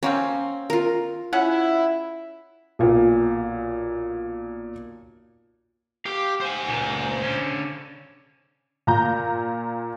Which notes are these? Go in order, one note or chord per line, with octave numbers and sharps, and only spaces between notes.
F#3 A#3 C4 C#4
F4 A#4
C#4 E4 G#4 F#5
B1 A#2
G4 F5
C5 G#5
C#2 A#2
D3 C#4
A#2 A#5 G6